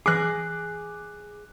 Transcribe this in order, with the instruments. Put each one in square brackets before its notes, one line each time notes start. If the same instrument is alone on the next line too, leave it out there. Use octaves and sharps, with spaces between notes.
[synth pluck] E3 A#6 C7 [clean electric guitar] G#4 [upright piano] D6 F#6